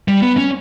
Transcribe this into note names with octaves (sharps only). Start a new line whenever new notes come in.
G3
B3
C#4